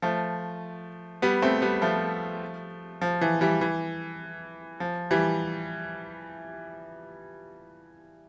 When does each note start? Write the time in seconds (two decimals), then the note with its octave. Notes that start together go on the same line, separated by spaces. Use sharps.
0.02 F3 A3
1.22 G3 B3
1.42 A3 C4
1.62 G3 B3
1.82 F3 A3
3.02 F3
3.21 E3
3.41 E3 G3
3.61 E3
4.80 F3
5.11 E3 G3